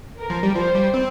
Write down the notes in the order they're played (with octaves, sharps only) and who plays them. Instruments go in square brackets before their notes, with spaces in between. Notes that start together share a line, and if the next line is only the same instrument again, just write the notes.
[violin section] A#4
[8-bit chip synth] F3
G3
[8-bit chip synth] F3 [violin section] C5
[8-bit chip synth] G3
C4